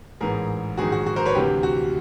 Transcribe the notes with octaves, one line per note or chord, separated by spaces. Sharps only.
A1 G#2 E3 G#4 A#4
A#1 G#2 D#3 F#4 G#4
F#4
F#4
A#4 C5
B4 C#5
D2 C3 E3 G4
F#4